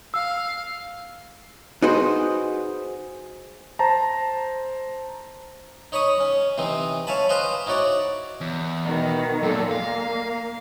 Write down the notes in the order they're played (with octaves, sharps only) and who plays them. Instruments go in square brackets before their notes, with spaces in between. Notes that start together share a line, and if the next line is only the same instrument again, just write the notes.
[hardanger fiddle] F5 [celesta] E6
[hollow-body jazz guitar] D#4 F#4 G#4 B4 C5
[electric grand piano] C5 A5 A#5
[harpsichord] D#4 C#5 B5 C#6 D#6
C#4
C3 E3 C4 D#4
C#5 E5 F5 G#5 A5 B5
B4 C5 D#5 F5 G#5 C6
D#4 E4 F#4 C#5 D5
[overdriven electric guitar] E2
[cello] B2 D#3
[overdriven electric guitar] F#2 [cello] A#2 A4
[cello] A#3 [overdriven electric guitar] F5